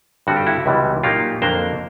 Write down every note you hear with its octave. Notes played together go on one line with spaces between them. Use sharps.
G2 D3 G3 C4 F#4
G4
E4 F#4
C#2 C3 E3 G3
A#2 F#3 A#3 D#4 F4 G4
F2 D3 F#3 A#3 D4 A#4 C5